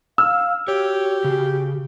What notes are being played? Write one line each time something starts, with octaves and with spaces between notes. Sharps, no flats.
F5 E6 F6
F#4 G4 C#5
C#3